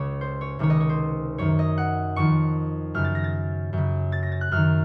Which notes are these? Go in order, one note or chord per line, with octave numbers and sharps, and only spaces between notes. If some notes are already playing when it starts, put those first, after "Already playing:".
Already playing: C#2 C#3 C#5
C5
C#5
C#2 C3 D#3 C#5
D#5
C#5
C5
F#2 D#3 C#5
D#5
F#5
F2 D#3 C#6
F#2 C#3 F6
A6
A#6
A6
F#2 C#3
A6
A#6
A6
F#6
F#2 D#3 F6